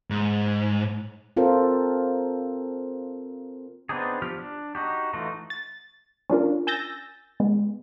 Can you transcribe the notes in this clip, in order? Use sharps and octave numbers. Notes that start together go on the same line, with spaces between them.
G#2
C4 F4 A4 A#4 C5
B3 C4 D4 D#4 G#4
F3 G4 F6
D4
D#4 F#4 G4
E3 A3 D#4 F4 F#4
A6
C#4 D4 F4 A#4
G#5 E6 G6 A6 A#6
G#3 B3